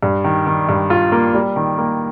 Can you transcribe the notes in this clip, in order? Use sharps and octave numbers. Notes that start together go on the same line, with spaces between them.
G2
D#3
D#3
G2
F4
A#3
G3
D#3
A#3